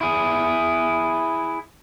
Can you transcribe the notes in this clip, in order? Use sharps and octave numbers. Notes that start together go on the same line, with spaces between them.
E4 G#4